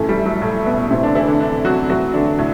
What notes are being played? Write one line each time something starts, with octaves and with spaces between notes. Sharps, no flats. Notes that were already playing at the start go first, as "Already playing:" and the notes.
Already playing: F#2 A2 E3 A3
G3
F#3
A2 A3
B2 B3
A2 C3 E3 C4
D3 D4
E3 E4
D3 D4
D3 D4
F#3 F#4
A2 E3 F#3 F#4
D3 D4
A2 A3